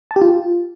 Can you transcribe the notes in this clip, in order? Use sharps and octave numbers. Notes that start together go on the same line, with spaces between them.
A5
G4
F4